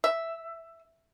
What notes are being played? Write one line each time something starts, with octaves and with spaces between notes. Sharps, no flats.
E5